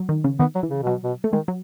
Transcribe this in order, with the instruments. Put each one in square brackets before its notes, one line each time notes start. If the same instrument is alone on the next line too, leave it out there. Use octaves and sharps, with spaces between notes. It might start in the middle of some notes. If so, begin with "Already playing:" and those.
Already playing: [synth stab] F#3
D#3
C#3
[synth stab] D#3 [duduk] B3
[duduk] F#3
[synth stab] E3
[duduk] C#3
[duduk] B2 [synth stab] F#3
[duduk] B2
[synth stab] A3
[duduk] D#3 [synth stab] G#3
[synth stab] F#3